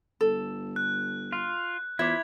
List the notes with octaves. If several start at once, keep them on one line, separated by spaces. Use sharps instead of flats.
G1 A4
F#6
F4
E2 E4 F4 C5 E5 D6 G#6